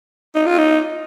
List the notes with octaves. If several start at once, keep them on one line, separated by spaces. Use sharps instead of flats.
D#4
F4
D#4